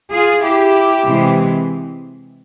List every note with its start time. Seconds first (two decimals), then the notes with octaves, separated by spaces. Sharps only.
0.12 F4 G#4
0.43 E4 G4
1.05 C3 E3 G#3 C4